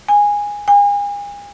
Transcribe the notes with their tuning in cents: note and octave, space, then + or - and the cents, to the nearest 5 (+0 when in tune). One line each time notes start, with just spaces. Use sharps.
G#5 -10
G#5 -35